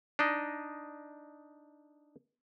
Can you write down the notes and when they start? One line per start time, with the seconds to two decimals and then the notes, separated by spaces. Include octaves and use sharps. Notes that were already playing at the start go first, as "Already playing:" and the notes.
0.19 D4 D#4 D#5